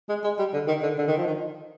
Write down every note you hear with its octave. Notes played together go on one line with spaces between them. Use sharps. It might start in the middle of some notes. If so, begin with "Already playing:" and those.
G#3
G#3
G3
D3
D#3
D3
D3
D#3
F3
D#3